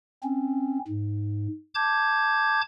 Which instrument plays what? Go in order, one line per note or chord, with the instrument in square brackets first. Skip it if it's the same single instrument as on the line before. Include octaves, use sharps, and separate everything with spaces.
[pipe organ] C4 C#4
G#2
A5 D6 G6 G#6